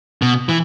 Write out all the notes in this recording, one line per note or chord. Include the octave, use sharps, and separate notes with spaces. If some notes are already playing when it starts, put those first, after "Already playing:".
B2
E3